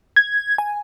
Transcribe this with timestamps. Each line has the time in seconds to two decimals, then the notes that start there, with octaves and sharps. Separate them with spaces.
0.16 G#6
0.58 G#5